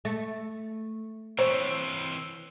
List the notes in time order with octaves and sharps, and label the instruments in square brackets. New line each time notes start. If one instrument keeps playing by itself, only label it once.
[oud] A3
[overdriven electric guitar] E3 C4 [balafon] C5 [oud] C#5